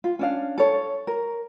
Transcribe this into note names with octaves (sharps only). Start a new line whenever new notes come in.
F4
C#4 D4 F5
A4 C#5
A#4